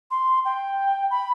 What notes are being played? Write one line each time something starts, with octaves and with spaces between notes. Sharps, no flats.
C6
G5
B5